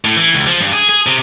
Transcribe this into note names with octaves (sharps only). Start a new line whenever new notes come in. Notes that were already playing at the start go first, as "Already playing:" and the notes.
A2
E3
C#2
F3
G2
G#4
G#4
C3